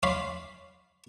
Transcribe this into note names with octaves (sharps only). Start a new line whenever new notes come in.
C#5 D5 F5 B5 C6